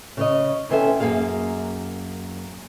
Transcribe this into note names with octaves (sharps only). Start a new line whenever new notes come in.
C#3 C#5 D#5
C3 E3 B3 C#4 A4 E5
F#2 D#3 A#3 G#4 F5